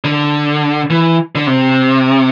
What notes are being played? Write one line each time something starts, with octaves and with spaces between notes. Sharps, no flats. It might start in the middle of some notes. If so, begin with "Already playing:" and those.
D3
E3
D3
C3